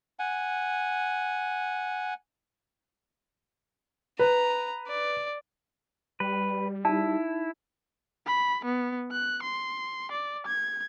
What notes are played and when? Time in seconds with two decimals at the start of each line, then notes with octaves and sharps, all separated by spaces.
0.19 F#5 G#5
4.19 B4 A#5
4.88 D5
6.20 G3 B4
6.85 D#4 E4 A5
8.27 B5
8.65 B3
9.12 F#6
9.43 C6
10.12 D5
10.47 G#6